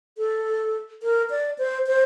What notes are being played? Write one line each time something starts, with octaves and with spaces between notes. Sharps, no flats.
A4
A#4
D5
C5
C5